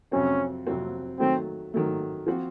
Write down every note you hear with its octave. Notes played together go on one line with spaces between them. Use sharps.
F2 C3 F#3 C4 C#4
F2 C3 F#3 C4
D#3 F#3 A3 C4
D#3 F#3 A3
F3 C4 F#4